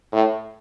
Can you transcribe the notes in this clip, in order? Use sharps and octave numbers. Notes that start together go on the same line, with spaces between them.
A2